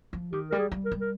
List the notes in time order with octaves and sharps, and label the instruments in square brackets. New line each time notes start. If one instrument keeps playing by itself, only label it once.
[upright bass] F3
[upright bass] D#3 [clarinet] G4
[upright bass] G3 [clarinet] A#4
[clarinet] G#4
[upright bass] G3
[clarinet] A#4
[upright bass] G3
[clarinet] A#4